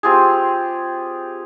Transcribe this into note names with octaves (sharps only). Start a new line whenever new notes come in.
C4 F4 G4 G#4